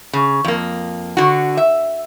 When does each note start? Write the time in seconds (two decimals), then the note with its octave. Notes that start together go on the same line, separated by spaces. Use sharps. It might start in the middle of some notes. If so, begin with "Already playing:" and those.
0.13 C#3
0.44 F2 A#3
1.17 D3 F#4
1.57 E5